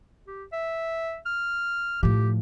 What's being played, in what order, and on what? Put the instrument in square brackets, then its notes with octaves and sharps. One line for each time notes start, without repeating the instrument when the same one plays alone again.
[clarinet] G4
E5
F6
[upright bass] A2 F3 [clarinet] G4